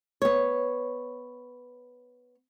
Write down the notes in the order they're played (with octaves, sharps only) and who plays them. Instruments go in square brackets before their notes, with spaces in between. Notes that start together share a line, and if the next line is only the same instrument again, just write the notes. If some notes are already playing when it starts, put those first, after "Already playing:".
[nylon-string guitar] B3 C#5